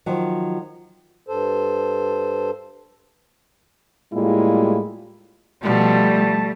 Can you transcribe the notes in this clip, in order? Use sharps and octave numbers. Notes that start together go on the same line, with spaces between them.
D#3 F3 F#3
G2 A4 C5
A2 G3 G#3 A#3 E4 F4
B2 F3 G3 A3 A5